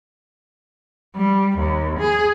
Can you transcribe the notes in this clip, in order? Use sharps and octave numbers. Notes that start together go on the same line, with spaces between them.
G3
D#2
G#4